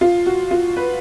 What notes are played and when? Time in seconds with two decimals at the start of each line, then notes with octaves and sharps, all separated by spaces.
0.01 F4
0.26 F#4
0.51 F4
0.76 B4